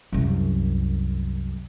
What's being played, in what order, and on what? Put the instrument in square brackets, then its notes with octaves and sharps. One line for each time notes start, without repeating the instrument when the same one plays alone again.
[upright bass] C2 F#2